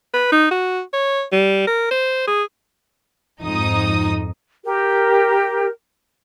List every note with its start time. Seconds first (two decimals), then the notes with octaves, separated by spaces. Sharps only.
0.14 B4
0.32 D#4
0.51 F#4
0.93 C#5
1.32 G3
1.67 A#4
1.91 C5
2.27 G#4
3.42 F2 G#2 D#4 D#6
4.65 G4 A#4